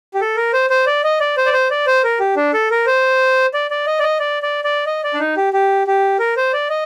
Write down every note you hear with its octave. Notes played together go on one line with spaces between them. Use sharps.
G4
A4
A#4
C5
C5
D5
D#5
D5
C5
D5
C5
D5
C5
A#4
G4
D4
A4
A#4
C5
D5
D5
D#5
D5
D#5
D5
D5
D5
D#5
D5
D4
D#4
G4
G4
G4
A#4
C5
D5
D#5